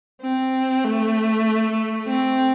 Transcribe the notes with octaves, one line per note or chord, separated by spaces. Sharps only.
C4
A3
C4